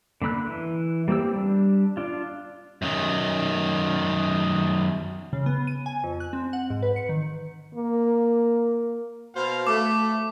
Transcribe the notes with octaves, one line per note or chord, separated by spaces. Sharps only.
D3 A#3 B5 E6 F#6
E3
G3 A#3 C4 G4 E6
G3 D4
D4 F4
F#2 D#3
C#3
B3
D#7
G#5
F2
F#6
C4
F#5
G#2
B4
C#7
D#3
A#3
B2 C5 F5
A3 D6